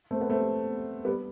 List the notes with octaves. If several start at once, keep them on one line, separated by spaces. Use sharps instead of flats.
A3 C4
B3
A3 C4
G3 B3